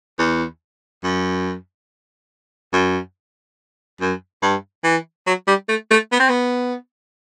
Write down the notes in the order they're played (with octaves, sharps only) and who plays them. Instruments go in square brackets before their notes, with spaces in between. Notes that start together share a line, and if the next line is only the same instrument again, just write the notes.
[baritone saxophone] E2
F#2
F#2
F#2
G2
E3
F#3
G3
A3
A3
B3
C4
B3